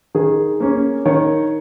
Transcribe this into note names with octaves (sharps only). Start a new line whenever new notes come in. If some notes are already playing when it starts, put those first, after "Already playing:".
D#3 G#4
A#3 C#4
D#3 C#5